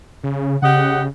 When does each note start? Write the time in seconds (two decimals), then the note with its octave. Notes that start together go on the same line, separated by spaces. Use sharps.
0.24 C#3
0.62 C#3 G4 D#5 F#5